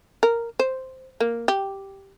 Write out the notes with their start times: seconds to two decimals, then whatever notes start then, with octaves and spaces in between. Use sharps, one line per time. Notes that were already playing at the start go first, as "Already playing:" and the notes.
0.23 A#4
0.59 C5
1.20 A#3
1.48 G4